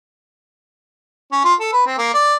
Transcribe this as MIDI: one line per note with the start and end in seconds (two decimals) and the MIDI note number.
1.32 1.40 61
1.44 1.54 65
1.60 1.70 69
1.73 1.81 71
1.86 1.98 60
1.98 2.10 58
2.14 2.35 74